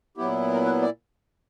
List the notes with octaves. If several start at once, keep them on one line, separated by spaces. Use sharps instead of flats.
A#2 F#3 B3 E4 G4
A#4
B4
D5